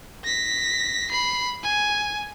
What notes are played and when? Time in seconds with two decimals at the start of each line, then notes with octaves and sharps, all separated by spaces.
0.24 A#6 B6
1.11 B5 C7
1.63 G#5